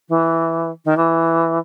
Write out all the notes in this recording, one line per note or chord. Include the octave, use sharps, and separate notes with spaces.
E3
D#3
E3